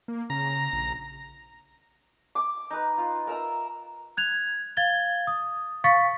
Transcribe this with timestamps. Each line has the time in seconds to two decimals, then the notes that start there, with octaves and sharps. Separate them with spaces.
0.08 A#3
0.30 C#3 A#5
0.73 A#1
2.35 D6
2.71 D#4 B4
2.98 F4
3.27 A#4 E5 A#5
4.17 F#6 G#6 F7
4.77 F5 G#6 A6 G7
5.27 D#6
5.84 F5 C#6 A6 B6 C#7